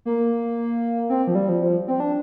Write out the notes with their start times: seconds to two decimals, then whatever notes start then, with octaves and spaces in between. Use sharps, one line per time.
0.05 A#3
1.10 C4
1.27 F3
1.35 G3
1.49 F3
1.62 F3
1.88 C4
2.00 D4